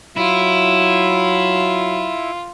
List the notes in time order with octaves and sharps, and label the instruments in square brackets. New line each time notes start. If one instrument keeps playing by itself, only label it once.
[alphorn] F#3 [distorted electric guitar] E4 [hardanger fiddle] F4